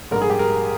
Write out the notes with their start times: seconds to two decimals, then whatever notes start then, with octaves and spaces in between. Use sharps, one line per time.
0.11 A#1 G#2 G3 A#4
0.22 G#4
0.30 G4
0.39 A#4